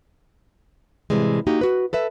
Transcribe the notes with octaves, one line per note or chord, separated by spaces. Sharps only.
A2 C3 E3 G3 G#3
A#3 D#4 F#4 G4
F#4 B4
A4 B4 E5